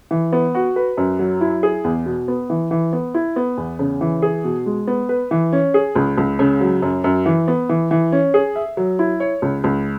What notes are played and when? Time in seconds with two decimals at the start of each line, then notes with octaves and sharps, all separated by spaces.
0.11 E3
0.32 B3
0.55 F#4
0.76 B4
0.97 F#2
1.19 F#3
1.41 E4
1.63 G#4
1.84 E2
2.06 B2
2.28 B3
2.50 E3
2.71 E3
2.93 B3
3.14 E4
3.36 B3
3.57 E2
3.79 C#3
4.01 E3
4.22 G#4
4.44 B2
4.66 G#3
4.87 B3
5.09 B4
5.31 E3
5.53 C#4
5.74 G#4
5.96 C#2
6.18 C#2
6.39 C#3
6.61 F#3
6.82 F#2
7.04 F#2
7.26 E3
7.48 B3
7.69 E3
7.91 E3
8.12 C#4
8.34 G#4
8.56 E5
8.77 F#3
8.99 E4
9.20 C#5
9.42 C#2
9.64 C#2